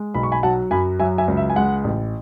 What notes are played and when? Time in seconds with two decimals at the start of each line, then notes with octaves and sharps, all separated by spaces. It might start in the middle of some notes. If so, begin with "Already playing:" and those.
Already playing: G#3
0.14 B1 B5
0.23 C#6
0.32 G#5 B5
0.43 F#3 F#5 A5
0.71 F#2 G#5 B5
1.00 F#3 E5 G#5
1.18 E5 G#5
1.28 C#2
1.37 E5
1.50 G#5
1.56 G#3 F#5
1.84 A1